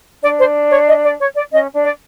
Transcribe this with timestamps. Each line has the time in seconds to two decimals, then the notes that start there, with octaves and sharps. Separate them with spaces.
0.23 D4 D5
0.39 C5
0.71 C#5
0.88 D#5
1.04 D5
1.20 C#5
1.36 D5
1.52 C#4 D#5
1.73 D4
1.85 D5